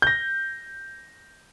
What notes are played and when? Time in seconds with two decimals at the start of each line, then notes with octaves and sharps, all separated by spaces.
0.02 G6 A#6